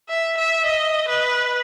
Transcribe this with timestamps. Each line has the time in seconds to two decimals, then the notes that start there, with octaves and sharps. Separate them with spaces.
0.09 E5
0.37 E5
0.66 D#5
1.09 B4